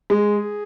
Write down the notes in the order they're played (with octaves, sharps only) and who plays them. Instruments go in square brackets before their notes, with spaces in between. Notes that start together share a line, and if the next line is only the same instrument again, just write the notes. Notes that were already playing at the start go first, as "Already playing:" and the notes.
[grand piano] G#3
[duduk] G#4